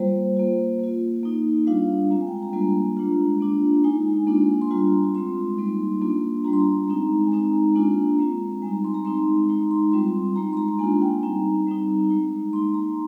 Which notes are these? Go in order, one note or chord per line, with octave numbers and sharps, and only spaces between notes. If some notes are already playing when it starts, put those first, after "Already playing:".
Already playing: G3 A#3 F4 C5
A#3 F4
A#3 F4
A#3 D#4
G3 D4 F4 F5
G#3 C4 F4 A#5
G#5
G5
G#5
A#5
G3 A#3 D4 F4 A#5
G#3 D4 F4
A#3 D4 F4
G#3 D#4 G#5
A#3 D4 F4
C6
G3 D4 F4 A#5
G#3 C4 F4 C6
G3 A#3 D#4
A#3 D4 F4
G3 D4 F4 A#5
C6
A#5
G#3 C4 D#4
G#5
G#3 C4 D#4 A#5
A#3 D4 F4
G#3 C4 F4 A#5
G3 C4 D#4 G#5
A#5
C6
A#5
G#3 C4 D#4 C6
G#3 D#4 A#5
C6
G3 C4 F4 C6
G#3 D#4 A#5
A#5
C6
A#5
A#5
A#3 D4 F4 G#5
G5
G3 C4 D#4 A#5
G3 C4 D#4
G#3 D#4
A#3 D#4 C6
A#5